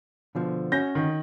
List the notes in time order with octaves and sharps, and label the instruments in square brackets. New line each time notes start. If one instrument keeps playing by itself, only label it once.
[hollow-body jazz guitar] B2 D3 F3
[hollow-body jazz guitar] C#4 F#4 [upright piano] G6 A#6
[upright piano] D#3